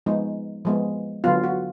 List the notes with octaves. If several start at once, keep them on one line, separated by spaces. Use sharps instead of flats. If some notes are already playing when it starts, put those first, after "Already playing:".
F3 G#3 B3 D#4
F3 G#3 B3
D3 F#3 B3 F4
F#4